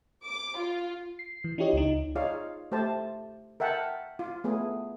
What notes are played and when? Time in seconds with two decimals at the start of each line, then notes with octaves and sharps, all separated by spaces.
0.23 D6
0.57 F4
1.19 C7
1.44 E3
1.58 D4 E4 F4 G4 C#5 D#5
1.73 C#2 D#4
2.16 D#4 F4 G#4 C#5 D5 F5
2.72 A3 G4 C5 A5
3.60 A#4 E5 F#5 G5 A5
4.19 F4
4.44 A3 B3 G#4